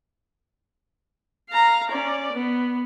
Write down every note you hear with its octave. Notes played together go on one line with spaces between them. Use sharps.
F5 A#5
C#4 D5
B3